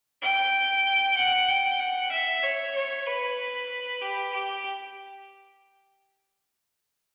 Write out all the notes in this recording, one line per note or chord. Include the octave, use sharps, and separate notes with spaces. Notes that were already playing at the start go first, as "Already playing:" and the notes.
G5
F#5
G5
F#5
E5
C#5
C#5
B4
G4
G4